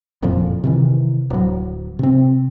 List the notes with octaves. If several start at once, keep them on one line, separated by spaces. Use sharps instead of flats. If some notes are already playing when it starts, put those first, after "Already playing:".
F#1 F2 A#2 F3
C3 D#3 E3
D1 F#3
C3 C4